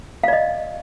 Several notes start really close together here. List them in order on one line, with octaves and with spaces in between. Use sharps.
F5 D5 D#5